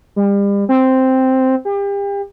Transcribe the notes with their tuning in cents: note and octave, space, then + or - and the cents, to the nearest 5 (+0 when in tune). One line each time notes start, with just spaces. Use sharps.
G3 +35
C4 +0
G4 +35